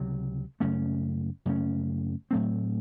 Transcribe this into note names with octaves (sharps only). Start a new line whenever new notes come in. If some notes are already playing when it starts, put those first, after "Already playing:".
Already playing: C#2 C3 F#3
F#2 C#3 A3 C#4
F#2 C#3 A3 C#4
A2 F#3 A3 C4